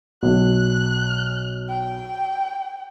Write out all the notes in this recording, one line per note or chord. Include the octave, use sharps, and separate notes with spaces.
B1 F#6
G5